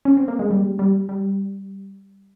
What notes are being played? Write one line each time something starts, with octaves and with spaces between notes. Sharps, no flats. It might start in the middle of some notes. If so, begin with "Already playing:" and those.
C#4
C4
A#3
G#3
G3
G3
G3